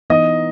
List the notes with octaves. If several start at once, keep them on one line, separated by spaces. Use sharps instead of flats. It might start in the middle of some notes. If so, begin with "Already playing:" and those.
E3 B3 D#4 D#5